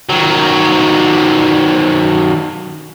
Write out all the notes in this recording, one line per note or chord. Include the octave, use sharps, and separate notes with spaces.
D#3 F#3